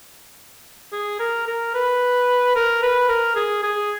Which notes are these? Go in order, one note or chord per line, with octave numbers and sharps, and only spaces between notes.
G#4
A#4
A#4
B4
A#4
B4
A#4
G#4
G#4